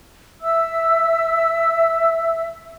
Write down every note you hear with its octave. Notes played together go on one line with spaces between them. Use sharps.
E5 E6